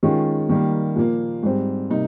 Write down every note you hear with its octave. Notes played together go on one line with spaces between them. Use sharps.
D#3 G#3 C#4 F4
D#3 G3 A#3
A#2 F3 A#3
G#2 G3 C4
C3 G3 A#3 D#4